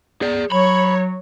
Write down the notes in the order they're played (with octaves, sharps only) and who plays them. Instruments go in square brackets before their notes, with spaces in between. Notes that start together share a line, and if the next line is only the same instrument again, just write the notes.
[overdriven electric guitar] G#4 D5
[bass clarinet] F#3 [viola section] C#5 [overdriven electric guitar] B5